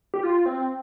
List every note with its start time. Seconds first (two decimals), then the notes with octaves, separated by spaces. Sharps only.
0.14 G4
0.23 F4
0.46 C4